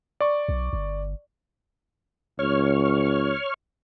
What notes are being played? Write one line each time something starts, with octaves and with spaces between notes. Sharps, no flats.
D5 C#6
B1
G1
C#2 C#5 C#6 F6